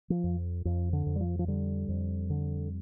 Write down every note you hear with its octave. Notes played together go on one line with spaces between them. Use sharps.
F3
F2
F2 F3
D3
F2
G3
F3
F3
D3 G3
F2
D3